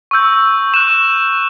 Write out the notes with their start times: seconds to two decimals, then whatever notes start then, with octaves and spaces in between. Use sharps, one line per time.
0.11 C#6 E6 G6
0.74 C#6 F#6 E7